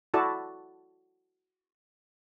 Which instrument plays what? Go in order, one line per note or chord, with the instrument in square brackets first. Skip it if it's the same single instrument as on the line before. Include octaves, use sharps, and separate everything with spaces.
[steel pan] E4 F#4 A4 D5 A5